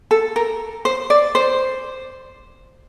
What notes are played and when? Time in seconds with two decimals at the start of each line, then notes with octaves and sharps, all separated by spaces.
0.11 A4
0.36 A#4
0.85 C5
1.10 D5
1.35 C5